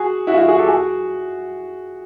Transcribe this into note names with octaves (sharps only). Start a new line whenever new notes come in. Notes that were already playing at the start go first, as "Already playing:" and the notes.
Already playing: F#4 G#4
E4 F#4
F4
E4 F#4
F#4 G#4
G4 A4
F#4 G#4